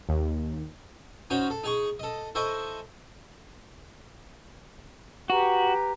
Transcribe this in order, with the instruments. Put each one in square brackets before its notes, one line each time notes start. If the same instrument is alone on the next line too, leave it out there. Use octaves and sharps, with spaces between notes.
[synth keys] D#2
[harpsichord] C#4 D#4 F#4 C5
A4
D#4 G#4 C#6
A4 D#5
E4 A4 C5 D#5 G#5 C#6
[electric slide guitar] F#4 [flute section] G4 B4 A#5